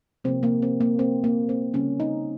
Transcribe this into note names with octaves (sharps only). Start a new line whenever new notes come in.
C3 F3 A#3 C4
A#3
C4
A#3
C4
A#3
C4
C#3 G3 A#3 C#4
D#4